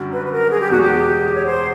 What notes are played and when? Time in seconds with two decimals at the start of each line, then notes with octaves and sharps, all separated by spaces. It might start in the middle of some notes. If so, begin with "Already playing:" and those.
Already playing: F#2 D3 G3
0.13 B4
0.26 B4
0.32 A#4
0.50 G#4
0.60 G4
0.70 E2 B2 G#3 F#4
0.82 G4
1.35 C#5
1.46 C5